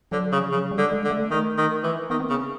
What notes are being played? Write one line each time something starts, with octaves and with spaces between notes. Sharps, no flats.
D3 F#3
C#3
F3
C#3 F#3
G3
D3
G#3
D3
A3
D#3 A3
D#3
E3
D#3 B3
C4
C#3 B3
C4